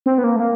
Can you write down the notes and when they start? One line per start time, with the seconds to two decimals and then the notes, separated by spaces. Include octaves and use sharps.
0.06 C4
0.18 B3
0.24 A#3
0.36 A3
0.40 A#3